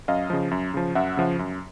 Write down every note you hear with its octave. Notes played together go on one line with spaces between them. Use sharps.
F#2 D#5 F5
C#3 F3
F#2
C#3 F3
F#2 E5 F#5
C#3 F3
F#2